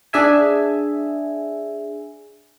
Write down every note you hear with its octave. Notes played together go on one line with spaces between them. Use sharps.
D4 G#4 E5 G#5